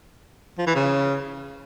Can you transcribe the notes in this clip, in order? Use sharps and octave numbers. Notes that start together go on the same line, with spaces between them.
F3
E3
C#3